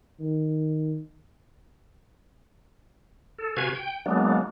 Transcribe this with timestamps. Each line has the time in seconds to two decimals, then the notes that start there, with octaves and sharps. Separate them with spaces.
0.20 D#3
3.38 A4
3.57 C3 F#4 B4 F5 G#5 G#6
3.75 G5
4.06 F#3 G#3 A#3 B3 D4